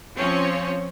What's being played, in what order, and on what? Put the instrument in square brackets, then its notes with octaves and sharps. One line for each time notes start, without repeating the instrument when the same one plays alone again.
[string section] F3 C4 C#4 C#5